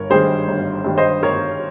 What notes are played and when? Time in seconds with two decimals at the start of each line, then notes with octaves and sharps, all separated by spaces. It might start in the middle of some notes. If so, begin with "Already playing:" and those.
Already playing: G1 A#4 C#5
0.10 G2 D#3 G3 G#4 C5
0.48 G1
0.84 G2 D#3 G3
0.98 C5 D#5
1.23 G1 A#4 C#5